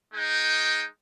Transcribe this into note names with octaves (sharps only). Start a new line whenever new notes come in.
G#3 D#4 G5